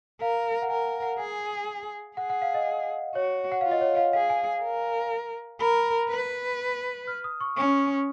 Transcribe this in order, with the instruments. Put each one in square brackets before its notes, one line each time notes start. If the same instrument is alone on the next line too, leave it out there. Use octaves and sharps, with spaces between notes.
[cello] A#4 [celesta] F5
[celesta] F#5
[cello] A#4 [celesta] G#5
[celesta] F#5
[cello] G#4 [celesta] G#5
[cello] G#4 [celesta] F#5
[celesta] F#5
F5
D#5
[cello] F#4 [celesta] C#5
[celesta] F#5
[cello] F4 [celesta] F5
[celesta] D#5
C#5
F5
[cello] G#4 [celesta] F5
[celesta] G#5
[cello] A#4
[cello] A#4 [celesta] B5
[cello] B4
[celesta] F6
D#6
C#6
[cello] C#4 [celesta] C#6